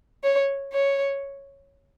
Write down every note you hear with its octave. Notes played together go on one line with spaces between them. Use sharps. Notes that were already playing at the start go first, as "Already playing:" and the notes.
C#5
C#5